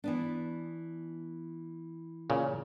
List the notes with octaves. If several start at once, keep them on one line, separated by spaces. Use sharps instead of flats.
E3 B3 D4
A#2 C#3